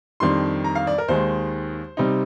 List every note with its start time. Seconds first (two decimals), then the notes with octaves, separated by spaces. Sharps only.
0.20 F2 D#3 G3 D4 C6
0.64 A#5
0.75 F5
0.87 D5
0.98 A#4
1.08 D#2 D#3 G#3 C5
1.97 C3 G3 C4 D#4